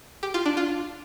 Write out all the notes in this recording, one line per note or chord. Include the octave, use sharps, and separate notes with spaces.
G4
F4
D4
F4